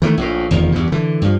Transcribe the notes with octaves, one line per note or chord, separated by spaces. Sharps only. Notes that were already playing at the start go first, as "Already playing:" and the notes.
D#3 E3 F#3 A3
A#1 A2
F1 E2 D#3 F3
E2 G2 B2
D3 E3
G2 F3